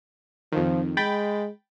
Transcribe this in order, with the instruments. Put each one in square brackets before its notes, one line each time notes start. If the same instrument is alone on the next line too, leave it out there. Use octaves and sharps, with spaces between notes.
[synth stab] F2 D#3 [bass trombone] F3
[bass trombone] G#3 [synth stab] G5 B5 A6